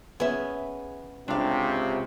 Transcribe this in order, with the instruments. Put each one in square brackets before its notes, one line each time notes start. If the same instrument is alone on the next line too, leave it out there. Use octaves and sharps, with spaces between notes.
[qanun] B3 C#4 [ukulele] G#4 E5
[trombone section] C#2 C3 [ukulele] D4 F5